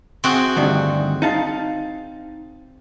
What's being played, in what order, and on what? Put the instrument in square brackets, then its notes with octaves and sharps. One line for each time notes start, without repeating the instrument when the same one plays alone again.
[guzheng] C4 F#4 G#4
[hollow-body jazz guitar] D2 G2 D#3
D#4 F5 A5